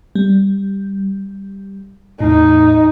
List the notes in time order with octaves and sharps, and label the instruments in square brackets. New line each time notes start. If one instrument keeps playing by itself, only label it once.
[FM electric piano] G3
[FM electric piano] E2 A2 [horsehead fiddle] D#4